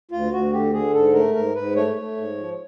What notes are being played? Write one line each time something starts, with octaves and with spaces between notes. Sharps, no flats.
D2 F4
D2 F#4
D3 G4
D3 G#4
G#2 A4
A3 A#4
G#2 A#4
G#2 B4
A3 C#5
A3
G#2
F3